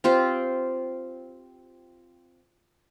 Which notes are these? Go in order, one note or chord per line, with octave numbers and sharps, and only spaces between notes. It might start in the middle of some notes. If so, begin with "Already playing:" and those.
C4 F4 G4 C5